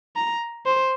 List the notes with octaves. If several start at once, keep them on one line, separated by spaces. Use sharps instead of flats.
A#5
C5